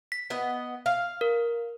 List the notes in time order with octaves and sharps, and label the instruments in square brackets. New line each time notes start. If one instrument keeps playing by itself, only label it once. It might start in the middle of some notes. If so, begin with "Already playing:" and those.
[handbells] B6
[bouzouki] B3 D#5
F5
[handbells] A#4